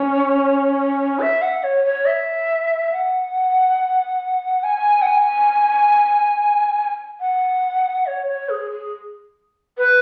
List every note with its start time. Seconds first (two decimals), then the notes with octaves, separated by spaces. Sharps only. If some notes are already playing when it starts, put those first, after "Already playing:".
Already playing: C#4
1.20 E5
1.42 F#5
1.63 C#5
1.85 C#5
2.06 E5
2.92 F#5
4.63 G#5
5.02 F#5
5.06 G#5
7.20 F#5
8.06 C#5
8.27 C#5
8.49 G#4
8.71 G#4
9.77 B4